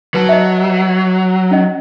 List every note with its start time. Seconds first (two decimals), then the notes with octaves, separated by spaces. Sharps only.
0.14 F#3 B4 A5
0.29 D#5 E5
1.51 C#4 D#5